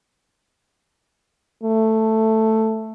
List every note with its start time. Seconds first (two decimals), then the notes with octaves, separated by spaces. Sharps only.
1.64 A3